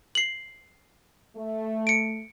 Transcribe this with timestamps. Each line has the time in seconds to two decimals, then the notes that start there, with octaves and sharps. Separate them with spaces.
0.15 C7 F#7
1.37 A3
1.87 C#7 D7